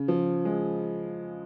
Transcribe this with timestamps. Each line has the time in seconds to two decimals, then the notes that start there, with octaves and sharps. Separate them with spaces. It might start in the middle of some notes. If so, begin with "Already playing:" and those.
Already playing: C#3
0.08 F3
0.45 G#3